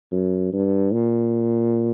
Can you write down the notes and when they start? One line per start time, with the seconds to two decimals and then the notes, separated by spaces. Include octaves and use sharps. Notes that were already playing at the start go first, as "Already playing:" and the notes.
0.12 F#2
0.53 G2
0.93 A#2